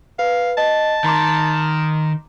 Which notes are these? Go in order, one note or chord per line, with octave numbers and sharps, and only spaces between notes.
B4 F5
D#5 A5
D#3 A#5 C6 D6